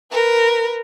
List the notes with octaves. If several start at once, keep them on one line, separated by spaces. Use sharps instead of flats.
A#4 B4